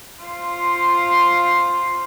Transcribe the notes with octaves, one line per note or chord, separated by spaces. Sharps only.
F4 C5